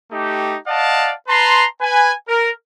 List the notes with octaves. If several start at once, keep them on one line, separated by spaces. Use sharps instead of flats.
A3 D#4 G4
D5 D#5 F5 F#5 A5
B4 A5 A#5 C6
B4 G#5
A#4